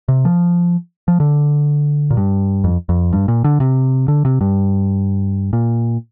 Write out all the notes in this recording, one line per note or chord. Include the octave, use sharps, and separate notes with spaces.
C3
F3
F3
D3
A#2
G2
F2
F2
G2
A#2
D3
C3
D3
C3
G2
A#2